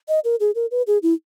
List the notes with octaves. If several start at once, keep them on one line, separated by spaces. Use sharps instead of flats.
D#5
A#4
G#4
A#4
B4
G#4
E4